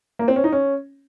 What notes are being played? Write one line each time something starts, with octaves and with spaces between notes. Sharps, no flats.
A#3
C4
C#4
D#4
C#4